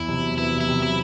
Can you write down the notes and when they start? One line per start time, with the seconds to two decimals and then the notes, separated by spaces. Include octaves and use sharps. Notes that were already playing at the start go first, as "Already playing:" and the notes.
Already playing: E2 E4
0.08 C3
0.23 F#3
0.38 B3 E4
0.53 C3
0.60 E4
0.68 C3
0.83 F#3 E4